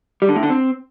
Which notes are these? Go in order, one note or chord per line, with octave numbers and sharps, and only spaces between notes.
G3
D3
A2
D3
C4